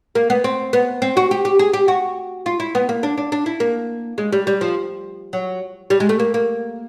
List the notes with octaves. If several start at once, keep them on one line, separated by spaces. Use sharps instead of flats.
A#3
B3
C4
B3
C4
F#4
G4
G4
G#4
G4
F#4
F4
E4
B3
A#3
D4
D4
D4
E4
A#3
G#3
G3
G3
F3
F#3
G3
G#3
A3
A#3
A#3